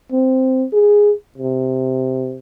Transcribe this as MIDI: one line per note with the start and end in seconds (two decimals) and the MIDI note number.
0.12 0.65 60
0.73 1.12 68
1.38 2.38 48